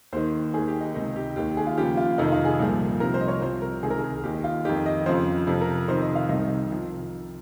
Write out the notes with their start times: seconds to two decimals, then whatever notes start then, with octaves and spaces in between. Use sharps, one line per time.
0.12 D#2 D#3 C5
0.54 D#2 D#3 G#4
0.68 G4
0.81 D#4
0.94 C#2 C3 D#3 D#4
1.16 G4
1.36 D#2 D#3 G4
1.57 G#4
1.67 F4
1.78 D#2 C#3 F3 G4
1.97 F4
2.18 F2 C3 D#3 D#4
2.32 F4
2.45 G#4
2.59 C2 A#2 F3
3.00 C2 C3 F3 A#4
3.14 C5
3.21 D#5
3.28 C#5
3.41 C2 C3 F3 C5
3.62 A#4
3.83 C#2 C3 D#3 G#4
3.90 A#4
3.99 G#4
4.23 D#2 D#3 G4
4.35 D#4
4.44 F4
4.65 F2 D#3 G4
4.86 D#5
5.06 F2 C#3 F3 C5
5.47 F2 C3 F3
5.61 A#4
5.88 F2 C3 D#3 C5
6.02 D#5
6.15 F5
6.29 C2 C3 D#3 D#5
6.71 C3 F3